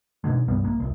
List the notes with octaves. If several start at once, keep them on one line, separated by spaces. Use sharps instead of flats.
G#2 B2 D3 G#3
C2 G2 G3 B3
A#1 A#3
D#1 C2